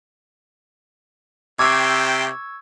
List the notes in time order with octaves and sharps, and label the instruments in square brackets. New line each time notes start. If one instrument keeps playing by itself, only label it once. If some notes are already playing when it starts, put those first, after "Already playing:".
[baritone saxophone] C3 [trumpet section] G4 C5 G5 [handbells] C#6 E6 G#6 [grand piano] D6